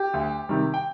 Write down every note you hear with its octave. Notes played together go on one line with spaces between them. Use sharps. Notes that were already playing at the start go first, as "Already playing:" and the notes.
Already playing: G4
D2
C3 D#3 G3
G5